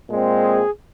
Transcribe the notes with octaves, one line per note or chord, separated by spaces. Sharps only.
A#2 G#3 C4
G#4